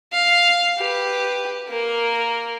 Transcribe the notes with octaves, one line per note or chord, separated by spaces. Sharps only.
F5
G4 B4
A#3 A#4